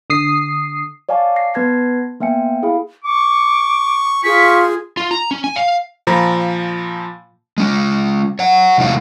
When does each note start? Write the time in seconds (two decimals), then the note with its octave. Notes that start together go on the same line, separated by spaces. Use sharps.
0.10 D3 D#6 C7
1.09 C#5 D5 F5 G#5 A5 D6
1.36 A#6 C7
1.54 B3 B4 A5 G#6 A#6 C7
2.20 A#3 B3 E5 G5 G#5 C#7
2.62 E4 G#4 F5 B5
3.04 C#6 D6
4.24 F4 G#4 C#6 B6
4.97 F4
5.11 A#5
5.31 C#4
5.44 G#5
5.56 F5
6.07 A#2 F3 A#5 B5
7.58 G#3 C#4
8.39 C#5 F#5
8.78 E2 C3 G#3 D#4 F#4 F5